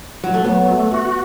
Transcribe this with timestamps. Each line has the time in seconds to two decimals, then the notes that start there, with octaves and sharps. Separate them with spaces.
0.24 F#3
0.34 A3
0.44 F#3 B3
0.68 A3
0.92 F#4